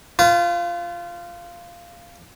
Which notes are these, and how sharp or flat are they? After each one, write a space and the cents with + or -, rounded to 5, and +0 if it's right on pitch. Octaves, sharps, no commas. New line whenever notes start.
F4 -10 B4 +45